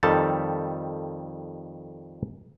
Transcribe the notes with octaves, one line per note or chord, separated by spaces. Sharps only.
F2 D#3 G3 A4 A5